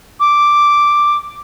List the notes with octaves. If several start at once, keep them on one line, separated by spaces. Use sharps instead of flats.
D6